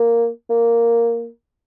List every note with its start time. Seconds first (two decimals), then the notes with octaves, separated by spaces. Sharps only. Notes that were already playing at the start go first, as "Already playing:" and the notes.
Already playing: A#3
0.50 A#3